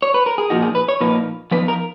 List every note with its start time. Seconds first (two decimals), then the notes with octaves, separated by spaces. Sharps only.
0.02 C#5
0.14 B4
0.26 A#4
0.38 G#4
0.50 A#2 F3 A#3 D#4 F#4
0.62 G#4
0.75 B4
0.89 C#5
1.00 A#2 F3 A#3 D#4 B4
1.51 F#2 F3 B3 D#4 B4
1.68 A#4